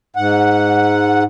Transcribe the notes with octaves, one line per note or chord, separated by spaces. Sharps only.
G#2 F#5